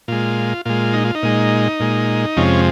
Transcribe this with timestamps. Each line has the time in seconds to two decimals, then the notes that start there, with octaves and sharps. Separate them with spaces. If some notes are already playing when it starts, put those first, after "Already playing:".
0.08 A#2 G#3 F4
0.65 A#2 G#3 F4
0.93 D#4
1.05 F4
1.15 D#4
1.23 A#2 G#3
1.80 A#2 G#3
2.37 F2 C3 F3 G#3 C#4